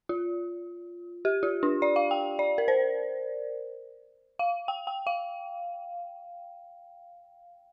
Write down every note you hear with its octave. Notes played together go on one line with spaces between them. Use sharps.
F4
G4
F4
D4
D5
F5
G5
D5
A#4
C5
F5
G5
G5
F5